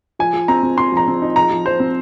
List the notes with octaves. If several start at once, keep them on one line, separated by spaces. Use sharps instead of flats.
F3 G#5
F3
C4 A#5
C4
C4 C6
F3 A#5
C4
D#4
F3 A#5
F3
F3 C5
C4